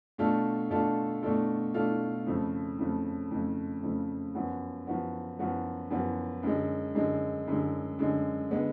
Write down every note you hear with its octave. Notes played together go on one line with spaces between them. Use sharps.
B2 A3 D4 F4 A4
B2 A3 D4 F4 A4
B2 A3 D4 F4 A4
B2 A3 D4 F4 A4
F2 C#3 F3 A3
F2 C#3 F3 A3
F2 C#3 F3 A3
F2 C#3 F3 A3
F#2 F3 B3 F#4
F#2 F3 B3 F#4
F#2 F3 B3 F#4
F#2 F3 B3 F#4
F#2 D3 G#3
F#2 D3 G#3
F#2 D3 G#3
F#2 D3 G#3
D3 G#3 B3